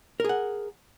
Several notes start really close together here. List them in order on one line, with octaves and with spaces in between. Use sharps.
A#4 G#4 F#5